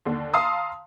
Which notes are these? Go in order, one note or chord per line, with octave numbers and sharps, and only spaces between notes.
D#2 D3
F5 A5 A#5 C6 D#6 E6